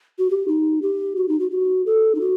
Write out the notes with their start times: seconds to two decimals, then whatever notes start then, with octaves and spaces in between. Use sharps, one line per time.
0.19 F#4
0.30 G4
0.48 D#4
0.82 G4
1.16 F#4
1.29 D#4
1.40 F#4
1.51 F#4
1.86 A4
2.15 D#4
2.21 F#4